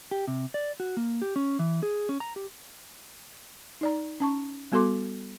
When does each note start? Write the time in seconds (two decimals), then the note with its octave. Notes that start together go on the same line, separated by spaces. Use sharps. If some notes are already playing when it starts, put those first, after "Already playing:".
0.11 G4
0.28 C3
0.54 D5
0.80 F#4
0.97 A#3
1.22 G4
1.36 C#4
1.59 E3
1.83 G#4
2.09 C#4
2.20 A#5
2.36 G4
3.81 D#4 D5 A#5
4.20 C#4 A5 C#6
4.72 G3 B3 F#4 A4 C6 D6